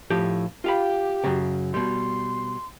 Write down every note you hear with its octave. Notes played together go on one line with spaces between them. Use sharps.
A2 F3 G4
F4 G4 F5 B5
F#2 C#3
B2 G3 C6